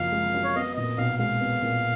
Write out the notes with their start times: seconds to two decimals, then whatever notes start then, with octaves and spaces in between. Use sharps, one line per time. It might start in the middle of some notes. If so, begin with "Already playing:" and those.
Already playing: F#1 F#2 F3 F5
0.12 G#3
0.34 F#2
0.44 C#5
0.55 B3 D#5
0.77 A#2 D#5
0.98 B1 F5
1.19 G#3 F5
1.41 B3
1.62 A#2